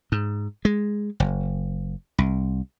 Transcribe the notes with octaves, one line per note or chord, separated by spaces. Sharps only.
G#2
G#3
F#1
C2